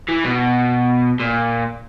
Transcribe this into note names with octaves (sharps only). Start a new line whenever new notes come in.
E3
B2
A#2